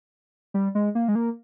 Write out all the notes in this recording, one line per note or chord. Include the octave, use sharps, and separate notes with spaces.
G3
G#3
A#3
G#3
A#3